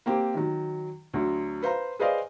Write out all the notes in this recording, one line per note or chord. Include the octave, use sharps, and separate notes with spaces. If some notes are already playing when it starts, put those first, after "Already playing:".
A#3 C4 G4
D#3 F#3
D2 F#3
B4 C5 F5 A#5
G#4 B4 C5 D5 D#5 F5